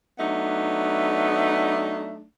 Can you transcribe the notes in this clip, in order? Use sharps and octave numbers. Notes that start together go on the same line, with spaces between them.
F#3 A3 B3 D4 D#4